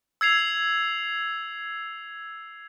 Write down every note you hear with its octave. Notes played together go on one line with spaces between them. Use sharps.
E6 G#6 C7 F7